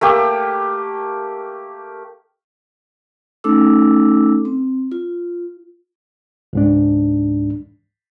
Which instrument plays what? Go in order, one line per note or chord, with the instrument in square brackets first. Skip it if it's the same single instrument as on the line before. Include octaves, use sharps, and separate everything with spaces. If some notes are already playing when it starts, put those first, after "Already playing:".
[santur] A3 A#3 G4
[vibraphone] A3 C#4 D#4 A4 D6 E6
C4
F4
[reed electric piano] C#2 G#2 D4